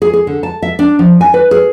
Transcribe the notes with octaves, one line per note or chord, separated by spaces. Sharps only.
G#4
G#4
D3
A5
E5
D4
F3
G#5
B4
G#4